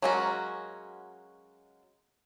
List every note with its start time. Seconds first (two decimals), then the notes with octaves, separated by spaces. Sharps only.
0.02 F#3 G#3 A#3 C#4 F#4